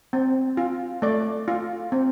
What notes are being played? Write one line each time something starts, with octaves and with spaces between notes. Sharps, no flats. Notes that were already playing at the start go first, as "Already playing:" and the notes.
C4
F4
A3 D5
F4
C4